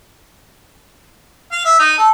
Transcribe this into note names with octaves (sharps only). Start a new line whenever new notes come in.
F5
E5
D#4
A4